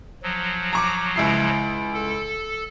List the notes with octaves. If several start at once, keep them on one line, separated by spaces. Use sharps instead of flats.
F3 F#3
A#5 C#6 D6
C#2 E4 C7
A4